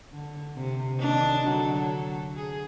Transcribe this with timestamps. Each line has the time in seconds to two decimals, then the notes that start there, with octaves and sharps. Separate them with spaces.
0.12 D3
0.56 C3
0.99 D#3 D4 D#5
1.46 D3 F#3 A4
2.37 G#4